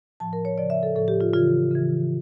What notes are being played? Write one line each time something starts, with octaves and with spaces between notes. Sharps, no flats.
A2 F3 A5
A#4
C#5
C#3 F3 D5
E5
A4
A2 F3 A4
G4
F4
C#3 E3 F4
C#3 E3